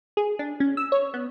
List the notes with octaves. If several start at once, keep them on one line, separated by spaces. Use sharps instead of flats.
G#4
D4
C#4
E6
C#5
B3